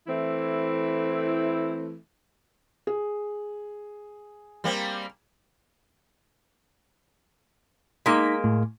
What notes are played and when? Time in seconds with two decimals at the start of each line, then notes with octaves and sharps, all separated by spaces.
0.06 E3 A3 C4 E4
2.87 G#4
4.64 G3 A#3 C4
8.06 G#3 A#3 D#4 A#5 B6
8.44 A2